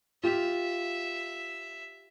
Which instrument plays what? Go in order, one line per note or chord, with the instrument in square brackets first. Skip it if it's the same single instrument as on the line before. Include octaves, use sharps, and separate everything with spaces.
[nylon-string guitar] F4 G4 [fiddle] E5